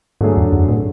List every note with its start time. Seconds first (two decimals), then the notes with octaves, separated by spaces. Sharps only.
0.21 G#2 D3 F#3 A3 D4 G#4
0.37 E2
0.53 F#2
0.69 A2